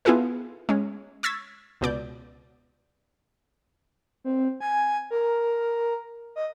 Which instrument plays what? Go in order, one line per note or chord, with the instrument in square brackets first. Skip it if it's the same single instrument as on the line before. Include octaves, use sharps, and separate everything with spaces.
[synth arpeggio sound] B3 E4 F4 G#4 A4 B4
G#3 C#4
C#6 E6 G#6 A6 B6
C#2 B2 D5 G6
[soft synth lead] C4
G#5
A#4
D#5